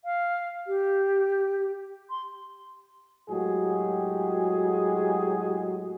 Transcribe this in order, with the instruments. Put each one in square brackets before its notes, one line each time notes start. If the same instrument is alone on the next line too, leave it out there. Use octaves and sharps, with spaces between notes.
[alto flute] F5
G4
C6
[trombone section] A2 F#3 G#3 G4 G#4